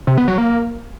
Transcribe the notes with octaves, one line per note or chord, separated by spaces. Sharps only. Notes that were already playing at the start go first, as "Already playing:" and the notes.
C3
B3
F#3
A#3